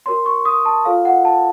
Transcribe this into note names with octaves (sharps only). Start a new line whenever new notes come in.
F#4 A#4 C#5 C6
C#6
D#6
A5
F4 A4 C#5 F5
F#5
A5